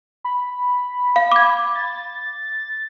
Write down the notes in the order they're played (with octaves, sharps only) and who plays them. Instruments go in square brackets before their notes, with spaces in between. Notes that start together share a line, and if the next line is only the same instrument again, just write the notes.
[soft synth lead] B5
[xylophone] F5
D6 G#6
[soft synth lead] A6